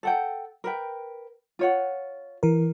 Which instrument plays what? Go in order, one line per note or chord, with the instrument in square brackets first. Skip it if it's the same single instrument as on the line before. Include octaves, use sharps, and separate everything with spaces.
[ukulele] A4 F#5 G5
A#4 B4 G5
F4 C#5 F#5
[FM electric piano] E3 A#4